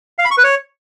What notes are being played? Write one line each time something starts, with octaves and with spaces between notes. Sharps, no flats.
F5
B5
C#6
B4
C#5